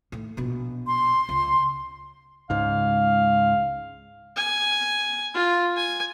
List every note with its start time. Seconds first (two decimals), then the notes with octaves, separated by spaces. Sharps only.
0.12 A2 D#3
0.37 A#1 B2
0.87 C6
1.29 C#2
2.50 C#2 G#2 F5
4.36 G#5
5.34 F4
5.77 G#5